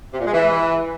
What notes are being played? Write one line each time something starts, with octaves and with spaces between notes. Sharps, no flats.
C3
A#2
G#3
E3